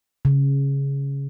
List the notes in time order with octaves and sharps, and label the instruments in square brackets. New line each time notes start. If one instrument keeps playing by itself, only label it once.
[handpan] C#3